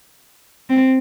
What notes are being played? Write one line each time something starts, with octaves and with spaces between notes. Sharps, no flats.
C4